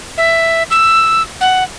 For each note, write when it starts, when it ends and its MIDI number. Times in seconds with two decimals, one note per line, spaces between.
0.18 0.63 76
0.70 1.23 88
1.41 1.63 78